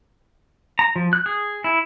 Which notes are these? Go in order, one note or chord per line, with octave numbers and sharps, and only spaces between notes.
A#5
F3
F#6
G#4
E4